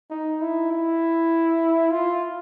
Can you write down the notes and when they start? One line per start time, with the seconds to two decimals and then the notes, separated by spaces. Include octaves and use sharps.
0.11 D#4
0.41 E4
0.71 E4
1.91 F4